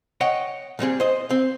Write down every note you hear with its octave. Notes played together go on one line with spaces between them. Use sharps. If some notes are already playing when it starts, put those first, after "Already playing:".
C#5 D#5 F#5 G5
A#2 G3 C4 G#4
C5 D#5
C4